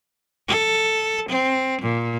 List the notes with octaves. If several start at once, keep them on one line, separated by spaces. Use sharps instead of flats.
A4
C4
A#2